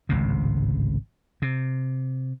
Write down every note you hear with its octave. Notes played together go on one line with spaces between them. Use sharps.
G#1 C#2 A2 C3
C3